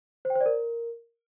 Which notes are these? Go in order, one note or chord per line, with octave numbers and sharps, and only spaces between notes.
C5
G5
C5
D5
A#4